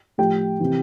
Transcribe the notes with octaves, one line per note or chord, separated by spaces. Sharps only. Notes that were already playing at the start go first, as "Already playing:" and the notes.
A2 F3 G4 G5
C3 E3